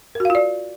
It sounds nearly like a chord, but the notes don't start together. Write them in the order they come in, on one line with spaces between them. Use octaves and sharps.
A#4 F#4 F5 F4 D5